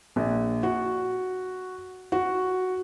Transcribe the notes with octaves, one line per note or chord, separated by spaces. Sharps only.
A#1
F#4
F#4